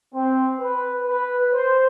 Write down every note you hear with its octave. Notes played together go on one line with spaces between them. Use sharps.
C4
B4
B4
C5